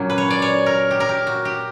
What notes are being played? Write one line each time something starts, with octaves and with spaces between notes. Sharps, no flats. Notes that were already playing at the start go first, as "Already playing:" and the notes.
Already playing: A#2 F#3 A#3 C#4
B4
C#5
D5
C#5
A#4
G4
A#4
G4
F#4
G4